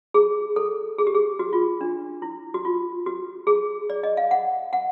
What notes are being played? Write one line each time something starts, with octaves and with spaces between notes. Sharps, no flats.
G#4
A4
G#4
G4
G#4
F#4
F4
D4
E4
F#4
F4
F#4
G#4
D5
D#5
F5
F#5
F#5